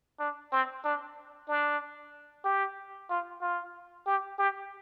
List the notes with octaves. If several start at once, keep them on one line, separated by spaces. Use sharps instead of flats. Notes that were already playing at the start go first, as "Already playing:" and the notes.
D4
C4
D4
D4
G4
F4
F4
G4
G4